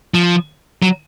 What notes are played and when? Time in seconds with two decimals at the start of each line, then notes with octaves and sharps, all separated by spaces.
0.14 F3
0.82 F#3